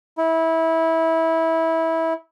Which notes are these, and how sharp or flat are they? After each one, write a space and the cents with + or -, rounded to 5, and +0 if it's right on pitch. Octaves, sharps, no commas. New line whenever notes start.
E4 -20